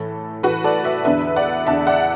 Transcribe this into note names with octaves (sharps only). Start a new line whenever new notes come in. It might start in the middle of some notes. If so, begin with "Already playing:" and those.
Already playing: A2 E3 A3 A4
A2 E3 A3 F#4 B4
A4 D5
B4 E5
E2 D3 B3 D4 B4 E5
D5 F#5
E2 D3 B3 D4 E5 A5
D5 F#5